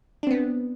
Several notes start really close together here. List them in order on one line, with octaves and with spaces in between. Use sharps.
D4 C4 B3